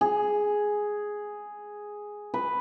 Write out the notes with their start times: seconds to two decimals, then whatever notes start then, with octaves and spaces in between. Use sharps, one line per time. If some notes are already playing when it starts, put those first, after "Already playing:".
0.01 G#4
2.34 B4